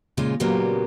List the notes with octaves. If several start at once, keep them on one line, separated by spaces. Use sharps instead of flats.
A#2 C#3 G#3 F4
A#2 C#3 F#3 G3 A#3 B3